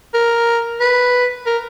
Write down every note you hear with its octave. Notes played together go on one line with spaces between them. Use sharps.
A#4
B4
A#4